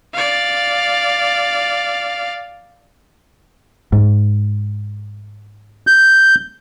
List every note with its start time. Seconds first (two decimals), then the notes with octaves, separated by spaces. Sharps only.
0.14 D5 F5
3.92 G#2
5.87 G6